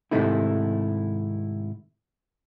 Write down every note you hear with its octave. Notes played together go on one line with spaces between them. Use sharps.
G#2 C3 D#3 A3 D#4 E4